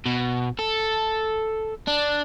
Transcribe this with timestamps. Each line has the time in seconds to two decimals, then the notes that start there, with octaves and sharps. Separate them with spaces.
0.06 B2
0.59 A4
1.88 D4